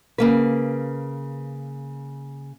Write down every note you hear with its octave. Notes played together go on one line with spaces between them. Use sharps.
C#3 A#3 B4